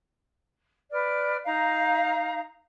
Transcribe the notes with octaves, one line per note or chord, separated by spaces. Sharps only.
B4 D5 F6
D#4 F5 A#5